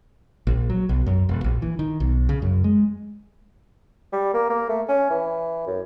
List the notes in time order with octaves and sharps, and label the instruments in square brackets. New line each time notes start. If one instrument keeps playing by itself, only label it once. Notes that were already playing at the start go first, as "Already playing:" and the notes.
[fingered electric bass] A#1
F#3
B1
F#2
E1
A#1
E3
D#3
B1
C#3
F#2
G#3
[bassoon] G3
A#3
A#3
A3
C#4
E3
F#2